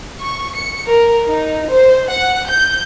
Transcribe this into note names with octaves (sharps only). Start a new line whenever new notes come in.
C#6
C#7
A#4
D#4
C5
F#5
G6